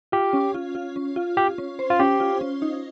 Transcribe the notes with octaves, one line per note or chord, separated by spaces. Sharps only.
F4 G4
C#4
F4
F4
C#4
F4
F4 G4
C#4
C5
F4
C#4 G4
F4
C#4
D#4